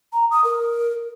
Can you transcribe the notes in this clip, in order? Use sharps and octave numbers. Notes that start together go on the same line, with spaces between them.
A#5
D#6
A#4